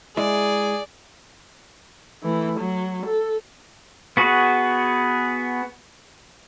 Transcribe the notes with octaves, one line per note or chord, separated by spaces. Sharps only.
G#3 E4 G#4 D5
E3 A3
F#3
A4
B3 F#4 G#4